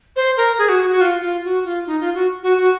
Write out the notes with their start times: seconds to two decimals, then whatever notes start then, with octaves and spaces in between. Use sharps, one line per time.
0.16 C5
0.37 A#4
0.58 G#4
0.69 F#4
0.79 F#4
0.91 F#4
1.01 F4
1.22 F4
1.44 F#4
1.65 F4
1.86 D#4
2.00 F4
2.15 F#4
2.43 F#4
2.57 F#4